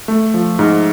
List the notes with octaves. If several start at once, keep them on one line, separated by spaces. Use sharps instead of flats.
A3
F3
G#2